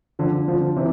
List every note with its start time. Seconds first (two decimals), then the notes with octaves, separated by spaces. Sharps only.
0.19 D3 F3
0.48 D3 F3
0.76 C3 E3